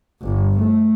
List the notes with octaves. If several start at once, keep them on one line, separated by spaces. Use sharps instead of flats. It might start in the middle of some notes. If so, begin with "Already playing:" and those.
G1
A3